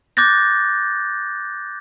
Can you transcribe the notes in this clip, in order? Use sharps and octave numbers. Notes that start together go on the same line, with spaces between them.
D6 F#6 G6 A6 A#6